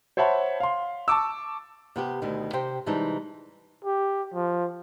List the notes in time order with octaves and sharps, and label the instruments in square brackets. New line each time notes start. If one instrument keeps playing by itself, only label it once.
[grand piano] C5 C#5 E5 F#5 A5 B5
F5 C6
A5 C#6 D6 E6
[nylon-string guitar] C3 B3 G4
D2 B2 D#3
C3 G4 C5 G5
C3 E3 G3 G#3 D#4 A5
[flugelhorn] G4
F3